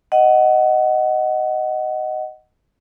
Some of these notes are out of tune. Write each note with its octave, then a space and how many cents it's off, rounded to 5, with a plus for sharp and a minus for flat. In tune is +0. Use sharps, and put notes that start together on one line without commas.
D#5 +0 F#5 +15